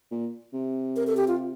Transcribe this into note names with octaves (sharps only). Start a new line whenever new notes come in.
A#2
C3
A#4
A4
G4
F4